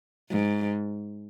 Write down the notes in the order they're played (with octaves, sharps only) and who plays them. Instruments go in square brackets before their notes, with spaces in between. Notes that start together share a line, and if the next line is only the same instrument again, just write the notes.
[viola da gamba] G#2